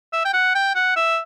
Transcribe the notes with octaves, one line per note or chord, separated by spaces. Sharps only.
E5
G5
F#5
G5
F#5
E5